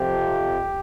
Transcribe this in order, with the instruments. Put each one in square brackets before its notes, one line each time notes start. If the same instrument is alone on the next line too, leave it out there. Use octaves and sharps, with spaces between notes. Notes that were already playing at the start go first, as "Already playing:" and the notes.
Already playing: [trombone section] F2 C3 F3 G4